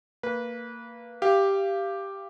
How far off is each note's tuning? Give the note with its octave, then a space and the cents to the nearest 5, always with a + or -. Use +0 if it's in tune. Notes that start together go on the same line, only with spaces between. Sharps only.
A#3 -20 B4 -20
G4 +0 F5 -25